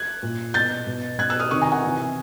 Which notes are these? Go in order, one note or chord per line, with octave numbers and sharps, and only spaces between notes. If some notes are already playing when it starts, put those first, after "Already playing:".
Already playing: F#6 G#6
A#2
B2 G6 A6
B2
B2 F#6 G#6
E6 F#6
D#6 F6
C3 D#3 C#6 D#6
G#5 A#5
F#5 G#5
C3 E3